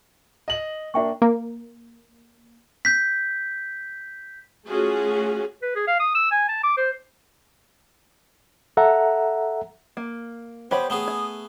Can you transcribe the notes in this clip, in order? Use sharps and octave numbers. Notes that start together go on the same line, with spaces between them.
D#5 F#7
A#3 D4 E5 G5 C#6
A#3
G6 B6
A3 C#4 F4 F#4 G#4
B4
G#4
F5
D#6
E6
G#5
A5
D6
C5
A4 E5 F#5 A#5
A#3
B3 G4 C5 C#5 B5
A3 B3 G#4 D#6
G#5